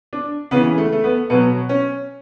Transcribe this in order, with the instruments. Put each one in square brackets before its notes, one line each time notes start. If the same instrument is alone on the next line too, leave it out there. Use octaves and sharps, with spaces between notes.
[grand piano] D4
C#3 E3 B3
A3
A3
B3
B2 F#3 B3
C#4